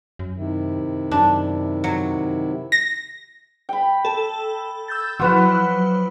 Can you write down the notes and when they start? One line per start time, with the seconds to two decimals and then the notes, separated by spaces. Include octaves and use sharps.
0.19 F#2
0.36 C3 D#3 E4
1.11 F#2 D4
1.84 F#3
2.72 A#6
3.69 G5 B5
4.05 A4
4.88 E6 G6 A6
5.20 F3 F#3 E4 F#4 B4 F#5